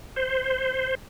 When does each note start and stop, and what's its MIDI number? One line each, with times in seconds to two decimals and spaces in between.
0.16 0.95 72